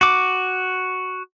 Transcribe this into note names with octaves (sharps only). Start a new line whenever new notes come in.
F#4 D6